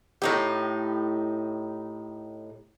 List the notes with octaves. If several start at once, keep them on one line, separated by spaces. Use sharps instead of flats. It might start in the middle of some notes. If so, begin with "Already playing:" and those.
A2 D#4 G4